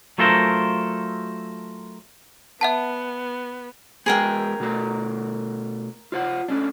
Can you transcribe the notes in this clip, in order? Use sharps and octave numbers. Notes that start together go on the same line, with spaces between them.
F#3 A3 F4 A4 A#4 C5
B3 E5 F#5 A5
G#3 B3 G#4 A#4 G5
B2 A3 A#5
F4 C5 F#5
A3 C#4 D4